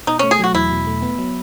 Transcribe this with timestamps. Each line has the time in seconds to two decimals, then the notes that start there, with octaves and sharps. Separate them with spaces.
0.07 B2 D#4
0.19 A3 C#4
0.31 G#4
0.39 F#3 F#4
0.55 E2 E4
0.71 B2
0.87 A3
1.02 B3
1.19 F#3